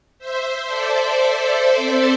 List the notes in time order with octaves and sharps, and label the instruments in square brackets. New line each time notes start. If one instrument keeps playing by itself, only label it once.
[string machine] C5 E5
A4 D5
A4 D5
C4